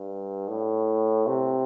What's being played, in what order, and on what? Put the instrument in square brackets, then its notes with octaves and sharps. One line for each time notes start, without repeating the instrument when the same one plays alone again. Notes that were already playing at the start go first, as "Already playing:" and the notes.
Already playing: [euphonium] G2
A2
C3